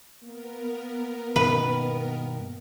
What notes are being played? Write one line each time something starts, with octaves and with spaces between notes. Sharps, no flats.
A#3 B3 A#4
G2 B2 D#3 B4